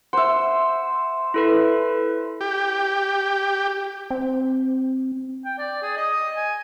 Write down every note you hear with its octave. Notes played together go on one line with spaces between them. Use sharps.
C5 E5 F#5
E4 A4 B4
G4
C4
G5
D5
G#4
D#5
G#5